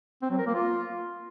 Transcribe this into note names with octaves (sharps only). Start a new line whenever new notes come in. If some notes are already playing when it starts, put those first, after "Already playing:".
C4
F#3
A#4
A#3
F4